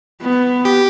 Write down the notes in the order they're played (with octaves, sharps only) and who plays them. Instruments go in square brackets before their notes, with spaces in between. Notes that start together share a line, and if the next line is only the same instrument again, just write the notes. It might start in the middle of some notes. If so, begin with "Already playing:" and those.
[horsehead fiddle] B3
[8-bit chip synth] G4